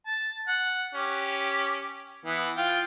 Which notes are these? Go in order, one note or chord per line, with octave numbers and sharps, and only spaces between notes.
A5
F#5
C#4 G4
E3 B3
F4 G5